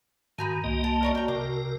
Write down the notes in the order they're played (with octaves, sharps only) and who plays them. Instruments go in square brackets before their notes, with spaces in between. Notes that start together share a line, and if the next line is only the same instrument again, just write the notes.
[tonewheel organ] G#2 D#3 [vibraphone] F#4 [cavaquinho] G#5 A#5 B5
[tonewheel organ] C2 A#3 D#5
[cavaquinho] A5
[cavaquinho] A#4 C#5 A5 [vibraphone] D5
[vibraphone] F#4 [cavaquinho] G5 A#5
[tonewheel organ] C3 A#4 [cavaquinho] D6